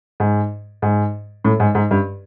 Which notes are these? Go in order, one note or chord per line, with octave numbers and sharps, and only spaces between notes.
G#2
G#2
A2
G#2
G#2
G2